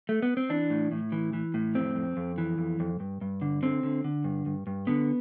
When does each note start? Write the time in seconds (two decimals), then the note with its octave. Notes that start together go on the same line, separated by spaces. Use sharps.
0.09 A3
0.22 B3
0.37 C4
0.49 E3 D4
0.70 A2
0.92 A2
1.12 E3
1.33 E3
1.54 A2
1.75 F2 C4
1.95 F2
2.17 F2
2.38 E3
2.58 F2
2.80 F2
3.00 G2
3.21 G2
3.42 D3
3.63 D3 C4
3.83 D3
4.04 D3
4.24 G2
4.46 G2
4.67 G2
4.87 D3 B3